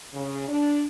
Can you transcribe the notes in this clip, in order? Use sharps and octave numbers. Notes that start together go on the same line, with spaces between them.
C#3
D4